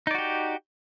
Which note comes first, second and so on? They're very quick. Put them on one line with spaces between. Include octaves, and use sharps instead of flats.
D#4 D5 F#4 G4